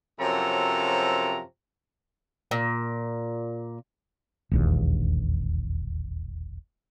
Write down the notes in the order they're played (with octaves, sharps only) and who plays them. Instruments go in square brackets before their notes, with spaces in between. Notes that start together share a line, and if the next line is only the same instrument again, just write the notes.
[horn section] F#2 C3 F3 F#3 A4 A#5
[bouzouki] A#2
[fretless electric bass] E1 A#1 D#2